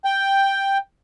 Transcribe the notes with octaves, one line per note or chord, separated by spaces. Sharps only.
G5